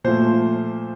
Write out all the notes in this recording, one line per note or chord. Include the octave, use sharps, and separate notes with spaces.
A#2 F3 A3 C5